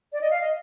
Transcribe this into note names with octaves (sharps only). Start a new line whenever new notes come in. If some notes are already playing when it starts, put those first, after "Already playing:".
D5
D#5
F5
D#5